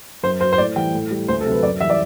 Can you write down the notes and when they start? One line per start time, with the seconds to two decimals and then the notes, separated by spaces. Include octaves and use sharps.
0.23 F#2 C5
0.41 F#3 C5
0.53 C5
0.58 A2 D5
0.76 E3 G3 G5
0.93 A2
1.11 G3
1.28 D2 C5
1.41 A4
1.46 C3 F#3
1.52 B4
1.63 F#2 D5
1.81 E3 G3 E5
1.90 D5